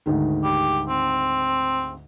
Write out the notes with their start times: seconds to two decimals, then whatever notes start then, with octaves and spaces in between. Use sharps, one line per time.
0.06 D2 G#2 D#3
0.43 G4
0.89 C4